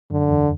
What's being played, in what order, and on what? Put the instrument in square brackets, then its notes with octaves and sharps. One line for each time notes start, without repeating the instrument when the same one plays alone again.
[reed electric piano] F#2 [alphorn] D3
[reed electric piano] E2